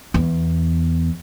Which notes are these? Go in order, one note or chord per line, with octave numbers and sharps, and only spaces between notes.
E2